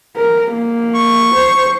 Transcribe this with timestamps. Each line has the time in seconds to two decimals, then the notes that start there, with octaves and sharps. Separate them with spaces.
0.16 A#4
0.52 A#3
0.95 C#6
1.35 C5